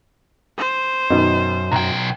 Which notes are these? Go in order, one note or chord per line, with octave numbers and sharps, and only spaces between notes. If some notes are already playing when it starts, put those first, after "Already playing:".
C5
F#2 B2 D#3
B1 G5 A#5